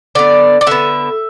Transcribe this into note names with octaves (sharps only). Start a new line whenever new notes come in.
D3 B3 D5
D5
D3 B3 E5